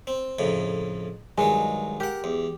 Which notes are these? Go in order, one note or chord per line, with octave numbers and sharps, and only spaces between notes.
C4
F2 A2 C#3
G2 D#3 F#3 G#3
G4 A#4 F#5
E2